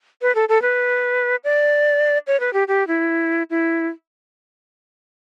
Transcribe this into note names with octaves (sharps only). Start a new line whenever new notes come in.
B4
A4
A4
B4
D5
C#5
B4
G4
G4
E4
E4